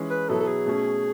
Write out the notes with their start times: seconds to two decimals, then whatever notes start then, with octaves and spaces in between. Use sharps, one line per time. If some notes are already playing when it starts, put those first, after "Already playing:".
Already playing: E3 G#3 C#4 G#4
0.10 B4
0.29 B2 F#3 B3 E4 A4
0.40 A4
0.47 G#4
0.66 B2 A3 C#4